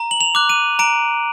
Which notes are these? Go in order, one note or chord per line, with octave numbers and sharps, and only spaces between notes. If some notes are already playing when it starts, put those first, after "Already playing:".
Already playing: A#5
F#7
F7
D6 F#6
D#7
A#5 D7